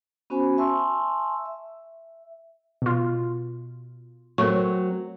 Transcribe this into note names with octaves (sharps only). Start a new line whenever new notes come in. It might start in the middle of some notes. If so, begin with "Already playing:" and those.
B3 C#4 F#4 C5 G#5 B5
E5 G#5 A5 C6 C#6 E6
E5
B2 F4
F#3 A3 C4 A#4 C#6